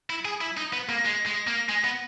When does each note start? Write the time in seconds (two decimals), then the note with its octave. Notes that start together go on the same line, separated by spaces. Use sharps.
0.10 E4
0.25 G#4
0.41 E4
0.57 D#4
0.73 B3
0.89 A#3
1.05 G#3
1.26 G#3
1.47 A#3
1.69 G#3
1.84 B3